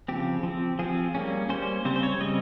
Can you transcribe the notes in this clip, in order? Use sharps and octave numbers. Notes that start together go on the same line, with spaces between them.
C#3 F3 C4 G4
F3 C4
F3 C4 G#4
G3 A#3 C#4
G3 A#3 C#4 C5
C#3 G3 C4 C5
C5
C#5
C#3 G3 C4 D#5